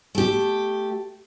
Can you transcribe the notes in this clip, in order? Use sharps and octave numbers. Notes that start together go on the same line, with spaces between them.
A3 G4